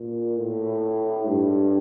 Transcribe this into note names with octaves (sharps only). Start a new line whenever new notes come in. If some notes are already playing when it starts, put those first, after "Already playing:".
Already playing: A#2
A2
G2